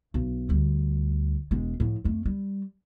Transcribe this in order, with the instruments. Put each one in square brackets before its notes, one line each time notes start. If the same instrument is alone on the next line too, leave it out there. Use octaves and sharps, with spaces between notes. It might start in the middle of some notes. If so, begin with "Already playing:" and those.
[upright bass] B1
D2 G3
E1 G#3
A2 F3
F2 A3
G3